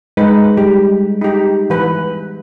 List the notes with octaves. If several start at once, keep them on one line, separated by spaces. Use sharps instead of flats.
G#3 D#4 B4
G3 G4
D#4 G4
E3 B4